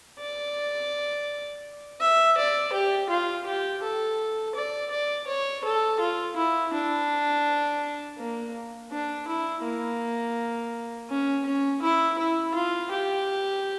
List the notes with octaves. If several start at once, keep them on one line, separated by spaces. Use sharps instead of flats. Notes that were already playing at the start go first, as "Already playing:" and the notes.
D5
E5
D5
G4
F4
G4
A4
D5
D5
C#5
A4
F4
E4
D4
A#3
D4
E4
A#3
C#4
C#4
E4
E4
F4
G4